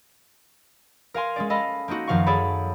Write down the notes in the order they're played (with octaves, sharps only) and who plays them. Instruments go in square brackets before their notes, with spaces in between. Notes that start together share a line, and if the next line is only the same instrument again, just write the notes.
[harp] A#4 F5 G#5 C6
G#3 C#4 D5
A4 D#5 F5 B5
A#3 C4 D#4 F#4
F#2 D#3 F3 F5 F#5 C#6
G#4 A4 C#5 D5 B5